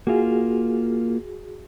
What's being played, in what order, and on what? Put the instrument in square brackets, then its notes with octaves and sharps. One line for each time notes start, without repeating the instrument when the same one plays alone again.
[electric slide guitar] A#3 F4 [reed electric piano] F#4 G#4